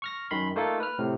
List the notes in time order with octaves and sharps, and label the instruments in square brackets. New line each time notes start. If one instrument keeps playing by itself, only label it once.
[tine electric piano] C#6 F6 A#6
F#2 D#3 B5 C6
A3 A#3 D#4 F4 A4
B4 F6
A2 C3